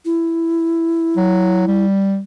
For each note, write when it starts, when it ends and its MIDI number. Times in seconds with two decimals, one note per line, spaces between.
0.05 1.85 64
1.16 1.65 54
1.67 2.20 55